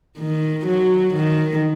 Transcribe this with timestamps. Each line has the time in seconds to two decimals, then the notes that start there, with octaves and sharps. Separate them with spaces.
0.19 D#3
0.66 F#3
1.14 D#3